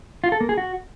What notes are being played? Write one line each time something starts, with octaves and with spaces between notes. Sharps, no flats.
F4
A4
A#3
G#4
F#4